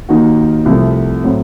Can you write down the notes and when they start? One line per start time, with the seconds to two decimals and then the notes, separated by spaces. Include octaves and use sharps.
0.09 D#2 D#3 A#3 D#4 F#4
0.65 C2 C3 F3 A3
1.24 A2 F#3 C4